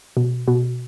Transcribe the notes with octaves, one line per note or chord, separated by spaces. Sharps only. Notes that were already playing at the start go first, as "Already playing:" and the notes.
B2
B2